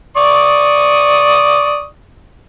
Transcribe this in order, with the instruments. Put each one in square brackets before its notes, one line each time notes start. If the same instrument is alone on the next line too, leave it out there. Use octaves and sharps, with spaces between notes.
[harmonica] D5 C#6 D#6